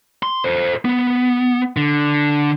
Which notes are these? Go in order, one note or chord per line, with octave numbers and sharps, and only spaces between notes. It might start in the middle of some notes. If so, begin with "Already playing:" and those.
C6
A4 C5
B3
D3